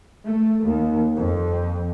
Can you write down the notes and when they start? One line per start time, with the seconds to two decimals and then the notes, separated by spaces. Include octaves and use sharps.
0.24 A3
0.64 D#2
1.16 F2